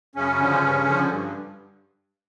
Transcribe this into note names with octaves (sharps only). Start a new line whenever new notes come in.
F#2 C#3 C#4
D3 F3
G2
D3 F3
G2